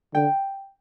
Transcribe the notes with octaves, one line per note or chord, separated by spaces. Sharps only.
D3 G5